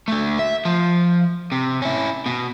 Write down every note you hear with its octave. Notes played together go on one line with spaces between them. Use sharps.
D3 A3
E5
F3
C3
C#4 E4
B2